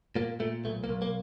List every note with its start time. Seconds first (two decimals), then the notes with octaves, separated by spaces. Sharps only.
0.15 A#2 A#3
0.40 A#2 A3
0.65 B1 A3
0.84 A#3
0.89 B1
1.02 A#3